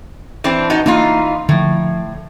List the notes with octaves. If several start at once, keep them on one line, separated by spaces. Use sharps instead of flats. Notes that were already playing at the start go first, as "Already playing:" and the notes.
E3 C4 D4
B3 D#4 F#4
E3 A#3 D4 D#4 F4
A2 D3 F3